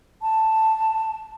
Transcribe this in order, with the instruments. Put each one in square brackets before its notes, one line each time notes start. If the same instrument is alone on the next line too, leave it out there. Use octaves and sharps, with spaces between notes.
[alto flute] A5